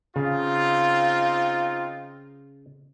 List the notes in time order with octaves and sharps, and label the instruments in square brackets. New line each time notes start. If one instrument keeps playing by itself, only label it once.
[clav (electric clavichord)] C#3 [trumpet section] C4 D#4 F4